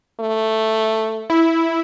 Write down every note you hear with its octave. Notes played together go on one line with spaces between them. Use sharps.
A3
E4